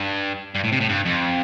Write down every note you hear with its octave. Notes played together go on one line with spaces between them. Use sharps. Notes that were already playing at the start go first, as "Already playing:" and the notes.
Already playing: G2
G2
A2
C3
A2
G2
F2